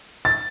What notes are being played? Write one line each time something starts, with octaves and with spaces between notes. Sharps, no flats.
A6